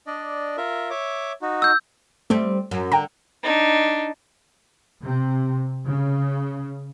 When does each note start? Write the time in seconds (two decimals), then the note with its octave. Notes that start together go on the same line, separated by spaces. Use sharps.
0.07 D4 D5 D#5
0.57 F4 A#4 E5
0.90 C#5 E5 D6
1.42 D#4 F#4
1.62 E6 G6
2.30 G3 A3 C4
2.71 F#2
2.92 D3 G5 A#5
3.43 D4 D#4
5.00 C3
5.86 C#3